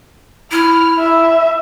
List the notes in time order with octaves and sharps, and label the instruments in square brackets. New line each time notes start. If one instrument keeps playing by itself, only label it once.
[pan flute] E4 [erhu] F6
[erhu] E5